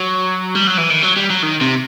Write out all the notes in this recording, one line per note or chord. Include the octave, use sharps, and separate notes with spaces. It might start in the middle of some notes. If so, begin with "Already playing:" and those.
Already playing: F#3
G3
F#3
E3
D#3
F#3
G3
F#3
D#3
C3